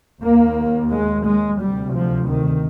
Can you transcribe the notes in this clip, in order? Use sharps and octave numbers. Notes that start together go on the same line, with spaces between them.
D#2 A#3
G#3
G#3
D2 C3 G3
F3
D#3